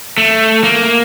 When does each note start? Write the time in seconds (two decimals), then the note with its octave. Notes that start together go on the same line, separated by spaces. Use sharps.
0.18 A3
0.64 A#3